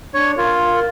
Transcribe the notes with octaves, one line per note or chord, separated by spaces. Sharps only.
D4 C#5
F4 A#4